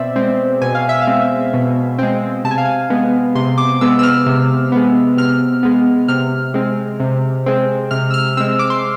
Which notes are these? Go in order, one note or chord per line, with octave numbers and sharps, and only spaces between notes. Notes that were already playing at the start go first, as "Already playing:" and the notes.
Already playing: B2 C4 C5 D5 E5
G#3 C4
B2 G#5
F5
E5
F5
G#3 C4
B2
G#3 C4
C3 A5
G#5
F5
G#5
G#3 B3
C3 C6
D6
G#3 B3 E6
E6
F6
C3
G#3 B3
C3 F6
G#3 B3
C3 F6
G#3 C4
C3
G#3 C4
C3 F6
E6
F6
G#3 C4 E6
D6
C6
D6